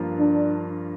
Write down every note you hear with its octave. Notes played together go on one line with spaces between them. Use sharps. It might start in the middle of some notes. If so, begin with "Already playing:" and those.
Already playing: G2 F3 A#3 F4
D4